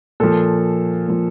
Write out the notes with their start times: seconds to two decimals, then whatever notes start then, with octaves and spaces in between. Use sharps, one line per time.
0.20 A#2 F3 A4
1.07 A#2 F3